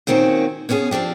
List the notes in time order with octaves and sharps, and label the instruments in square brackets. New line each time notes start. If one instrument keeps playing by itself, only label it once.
[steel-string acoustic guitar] A#2 D#3 C4 C#4 F#4
B2 B3 C#4 F#4 G#4
F3 C4 D4 G4